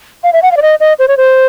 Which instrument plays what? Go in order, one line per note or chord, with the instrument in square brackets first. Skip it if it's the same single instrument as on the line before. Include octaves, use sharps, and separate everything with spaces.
[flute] F5
E5
F#5
F5
D5
D#5
D#5
C5
C#5
C5